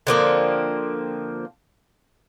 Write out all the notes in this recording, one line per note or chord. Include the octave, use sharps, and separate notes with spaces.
D3 F3 A#3 C4